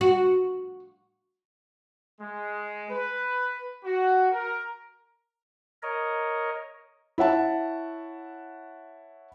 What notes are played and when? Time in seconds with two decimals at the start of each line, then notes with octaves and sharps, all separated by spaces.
0.01 F#4
2.21 G#3
2.89 B4
3.84 F#4
4.32 A#4
5.83 A#4 C#5 D#5
7.18 E4 C#5 F#5 A5